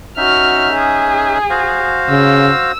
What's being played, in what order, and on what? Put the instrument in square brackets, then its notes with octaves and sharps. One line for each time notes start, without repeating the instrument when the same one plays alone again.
[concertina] C#4 D#4 E5 [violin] F#4 F6
[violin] G#4
[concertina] F#4 C5 F5
[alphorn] C#3 [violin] E6